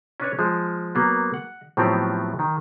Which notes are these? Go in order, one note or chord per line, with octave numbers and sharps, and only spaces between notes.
C#4 D4 B4 C#5
F3 G#3
F#3 A#3 B3
F#5
A2 F3 F#3 B3 C4 G4
D#3